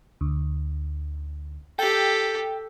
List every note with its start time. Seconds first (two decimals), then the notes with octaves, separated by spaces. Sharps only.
0.21 D2
1.79 G4 A4 G5